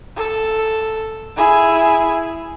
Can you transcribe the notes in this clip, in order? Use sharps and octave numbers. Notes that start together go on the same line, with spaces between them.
A4
E4 G#4